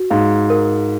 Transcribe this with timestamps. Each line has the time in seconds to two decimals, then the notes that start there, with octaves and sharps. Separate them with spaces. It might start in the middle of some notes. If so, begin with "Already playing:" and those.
Already playing: F#4
0.10 G#2 F5
0.50 A#4